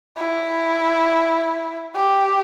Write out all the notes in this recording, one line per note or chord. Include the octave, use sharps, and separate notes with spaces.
E4
G4